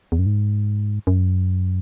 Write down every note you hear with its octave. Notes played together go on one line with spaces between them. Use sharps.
E2
F#2
G#2
F#2